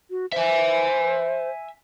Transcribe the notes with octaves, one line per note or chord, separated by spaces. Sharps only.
F#4
C5 E5 G#5